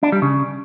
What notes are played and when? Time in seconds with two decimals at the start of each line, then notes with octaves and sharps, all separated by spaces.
0.03 D4
0.12 G3
0.22 C#3